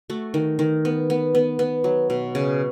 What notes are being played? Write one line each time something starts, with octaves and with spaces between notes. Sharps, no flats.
A3 F#4
D#3
D#3
B3
B3
B3
B3
F#3
B2
C#3